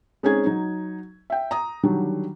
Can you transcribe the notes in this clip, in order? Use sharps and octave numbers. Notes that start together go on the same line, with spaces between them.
G#3 C4 C#4 D#4 G#4 G#6
F#3 D#4
E5 G5
A#5 D#6
D3 D#3 F#3 G3 D4